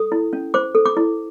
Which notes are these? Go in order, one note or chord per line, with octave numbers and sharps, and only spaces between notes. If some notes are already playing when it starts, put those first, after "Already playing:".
Already playing: A4 D#6
E4
C#4
C5 D6
A4
D6
E4